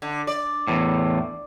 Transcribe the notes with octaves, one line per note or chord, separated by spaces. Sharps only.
D3
D5
E2 A2